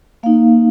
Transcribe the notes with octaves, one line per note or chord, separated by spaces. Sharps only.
A#3 D#4 F5